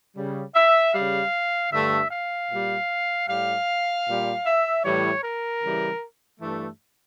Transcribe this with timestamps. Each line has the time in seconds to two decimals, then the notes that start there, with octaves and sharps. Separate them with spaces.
0.16 C#3 G3
0.55 E5
0.94 C#3 G3 F5
1.72 G2 D3 A3 E5
2.11 F5
2.50 A#2 G3
3.28 A2 G3 F5
4.06 A#2 G3
4.45 E5
4.84 A2 E3 G3 C#5
5.23 A#4
5.63 C#3 E3 G3
6.40 G2 E3 A3